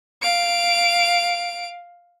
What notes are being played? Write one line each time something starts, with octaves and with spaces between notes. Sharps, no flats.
F5 D7